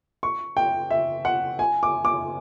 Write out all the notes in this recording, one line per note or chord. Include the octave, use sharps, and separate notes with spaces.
C#6
G5
E5
F#5
G#5
D6
D6